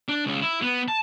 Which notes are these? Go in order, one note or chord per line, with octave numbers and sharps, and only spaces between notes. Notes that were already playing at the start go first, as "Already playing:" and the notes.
D4
C#2
E4
B3
A5